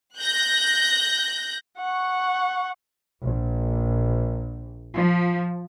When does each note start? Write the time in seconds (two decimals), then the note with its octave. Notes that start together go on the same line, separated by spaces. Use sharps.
0.18 F#6 G6 A#6
1.78 F#5 C#6
3.23 A#1
4.95 F3